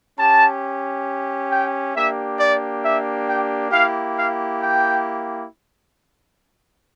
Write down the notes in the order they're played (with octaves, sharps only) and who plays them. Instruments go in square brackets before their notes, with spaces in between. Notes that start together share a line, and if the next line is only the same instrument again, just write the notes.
[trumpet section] C#4 G4 A5
G5
A#3 D4 G4 E5
D5
E5
G5
A#3 E4 G4 F5
F5
G5